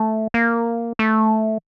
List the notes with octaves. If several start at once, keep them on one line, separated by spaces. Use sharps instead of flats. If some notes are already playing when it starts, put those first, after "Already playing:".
Already playing: A3
A#3
A3